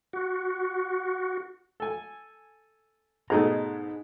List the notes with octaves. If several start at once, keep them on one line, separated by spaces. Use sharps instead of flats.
F#4
A4 G#5
G#2 B2 A3 D#4 G#4 A#5